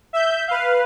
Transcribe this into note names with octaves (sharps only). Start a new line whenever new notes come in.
E5 G6
B4 F5